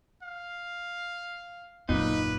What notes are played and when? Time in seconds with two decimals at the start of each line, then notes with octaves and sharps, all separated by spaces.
0.23 F5
1.89 D#1 F#2 A#2 D#4 B4